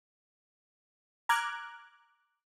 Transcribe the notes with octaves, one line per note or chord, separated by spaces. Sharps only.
A#5 D6 F6 F#6 G#6